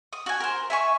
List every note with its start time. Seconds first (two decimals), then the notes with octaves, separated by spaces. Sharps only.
0.13 D#6
0.26 F#4 G#5
0.40 A#4 C5
0.70 E5 G#5 C#6